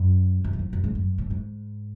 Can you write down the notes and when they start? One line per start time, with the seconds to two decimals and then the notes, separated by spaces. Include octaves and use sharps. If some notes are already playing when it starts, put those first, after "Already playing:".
Already playing: F#2
0.44 F#2
0.53 G#2
0.59 F#2
0.73 F#2
0.84 G#2
0.95 F#2
1.18 A2
1.30 G#2